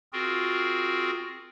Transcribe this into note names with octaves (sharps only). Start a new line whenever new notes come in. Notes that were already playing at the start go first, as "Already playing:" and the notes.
C4 F4 F#4 G#4 A#4